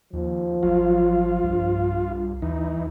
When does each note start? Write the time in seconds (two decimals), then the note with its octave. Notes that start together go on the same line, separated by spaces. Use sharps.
0.13 D#2 F3
0.63 G#1 F#3 F4
1.44 B1 G2
2.42 D#2 E3 D#4